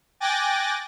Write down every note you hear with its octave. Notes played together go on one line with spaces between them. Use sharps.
G5 G#5 D6 F#6 A6 A#6